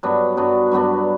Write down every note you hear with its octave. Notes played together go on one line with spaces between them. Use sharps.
G2 F#3 B3 D4
G2 F#3 B3 D4
G2 F#3 B3 D4